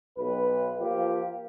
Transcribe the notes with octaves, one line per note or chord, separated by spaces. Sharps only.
B1 B4
F3 A#3 F4 G4